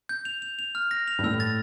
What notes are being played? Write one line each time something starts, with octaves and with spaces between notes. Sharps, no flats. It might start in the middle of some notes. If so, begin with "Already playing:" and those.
G6
F7
F7
F7
F6
A#6
F7
G2
A2 E6
A6